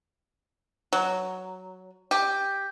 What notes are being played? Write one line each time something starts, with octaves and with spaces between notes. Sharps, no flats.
F#3
G4